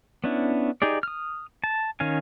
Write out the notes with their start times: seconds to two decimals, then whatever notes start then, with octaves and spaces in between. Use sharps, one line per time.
0.24 B3 C#4 D4 E4
0.82 D#4 G4 G#4 D5
1.03 D#6 F6
1.64 A5
2.00 D#3 C#4 F5 G#5